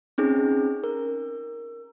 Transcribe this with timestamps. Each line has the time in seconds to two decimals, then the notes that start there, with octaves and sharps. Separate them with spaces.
0.18 C4 C#4 D#4 G#4
0.84 A#4